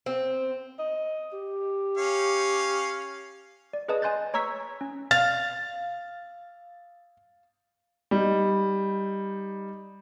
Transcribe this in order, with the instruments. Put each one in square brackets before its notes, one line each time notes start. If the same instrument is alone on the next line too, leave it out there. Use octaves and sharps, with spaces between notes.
[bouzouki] C4
[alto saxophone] D#5
G4
[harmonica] C#4 C#5 F5
[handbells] D5
G#4 B4 C#5 D#5 A5 D#6
D#5 G#5 C6 F#6 G6 A6
C#5 A#5 C#6 E6 G#6 B6
C#4
[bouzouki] F5 [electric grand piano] A6
[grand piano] G3 D#4